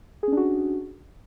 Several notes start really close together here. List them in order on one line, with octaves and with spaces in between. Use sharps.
G#4 C#4 D4 F#4